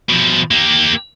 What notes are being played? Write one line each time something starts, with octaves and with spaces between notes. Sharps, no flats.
B2 F3
A#3 G4